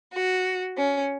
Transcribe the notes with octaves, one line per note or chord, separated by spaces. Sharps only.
F#4
C#4